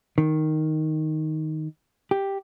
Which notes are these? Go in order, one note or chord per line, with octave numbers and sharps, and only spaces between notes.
D#3
G4